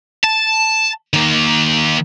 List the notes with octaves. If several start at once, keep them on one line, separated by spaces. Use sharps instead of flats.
A5
D#3 A#3